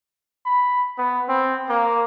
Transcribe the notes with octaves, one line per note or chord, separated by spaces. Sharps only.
B5
B3
C4
A#3